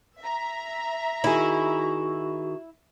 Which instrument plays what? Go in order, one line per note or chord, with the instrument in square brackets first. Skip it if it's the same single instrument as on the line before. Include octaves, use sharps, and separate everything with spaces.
[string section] E5 A#5
[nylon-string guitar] D#3 G#4 [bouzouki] E4 [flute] F#4